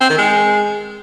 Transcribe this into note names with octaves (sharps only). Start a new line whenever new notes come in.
C4
D#3
G#3